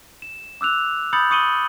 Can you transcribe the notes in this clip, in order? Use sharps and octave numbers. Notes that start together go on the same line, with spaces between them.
E7
D6 E6 F#6 F7
B5 D#6 G6 A6 C#7 F#7
C#6 D#6 C#7 D#7 F#7 G7